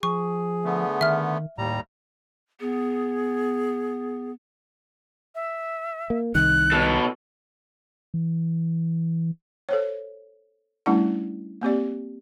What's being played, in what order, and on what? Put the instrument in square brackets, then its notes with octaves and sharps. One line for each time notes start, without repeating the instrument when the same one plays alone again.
[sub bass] F3 [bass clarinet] G#4 [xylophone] C#6
[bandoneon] D3 A3 B3
[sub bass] D#3 [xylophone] E5 F6
[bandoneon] D#2 G3 A#5 [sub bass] A2
[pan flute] B3 [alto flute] G#4
[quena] E5
[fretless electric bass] A#3
[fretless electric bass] C2 D#3 [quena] F#6
[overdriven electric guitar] B2 A4
[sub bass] E3
[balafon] A4 C5 C#5
G3 A3 C#4 D4 E4 F#5
A#3 C4 G4 D5